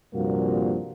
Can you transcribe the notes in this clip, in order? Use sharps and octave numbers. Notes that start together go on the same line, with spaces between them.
C2 G2 A#2 F3 A#3 F#4